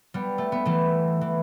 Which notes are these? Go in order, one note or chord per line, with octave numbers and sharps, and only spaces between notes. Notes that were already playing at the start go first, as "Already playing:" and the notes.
G3 B3
A3
B3
E3 A3
E3